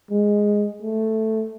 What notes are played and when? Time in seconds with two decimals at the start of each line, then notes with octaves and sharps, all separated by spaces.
0.11 G#3
0.83 A3